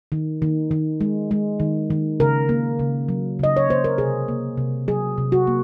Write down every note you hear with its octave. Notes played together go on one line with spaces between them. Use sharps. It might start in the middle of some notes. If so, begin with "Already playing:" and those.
D#3
D#3
D#3
G#3
G#3
D#3
D#3
C#3 A#4
A#3
C#3
F#3
C#3 D#5
C#5
A#3 C5
A#4
C3 G#4
A#3
C3
F#3 G#4
C3
F#4
A#3